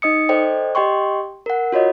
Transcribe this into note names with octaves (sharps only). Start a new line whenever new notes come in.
D#4 D#5 D#6 C#7
A4 C5 D5 D#5 G5
G4 D#5 G5 C6 C#6
A#4 F#5
F4 F#4 C#5 D#5